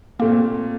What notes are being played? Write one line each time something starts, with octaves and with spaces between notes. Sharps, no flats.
A#2 A3 A#3 C4 F4